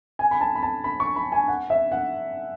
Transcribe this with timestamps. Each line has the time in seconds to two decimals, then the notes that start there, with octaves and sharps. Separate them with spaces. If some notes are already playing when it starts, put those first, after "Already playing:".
0.19 G#5
0.31 B5
0.41 A5
0.55 B5
0.63 A5
0.84 B5
1.00 C#6
1.16 B5
1.32 G#5
1.48 F#5
1.70 E5
1.92 F#5